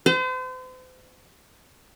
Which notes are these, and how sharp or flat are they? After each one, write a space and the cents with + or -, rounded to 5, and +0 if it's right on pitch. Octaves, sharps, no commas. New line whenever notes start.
C5 -40